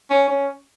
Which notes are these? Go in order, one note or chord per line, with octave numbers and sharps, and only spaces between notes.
C#4
C#4